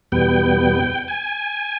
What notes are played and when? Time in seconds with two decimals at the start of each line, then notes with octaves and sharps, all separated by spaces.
0.12 E2 B2 G3 B3 G5
1.08 G#5